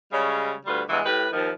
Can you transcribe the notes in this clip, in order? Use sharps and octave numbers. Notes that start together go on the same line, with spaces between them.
C#3 G3 G#3 C#5
D2 G3 F4 B4
E2 G2 E3 G#3
A2 G4 B4
D#2 D#3 F3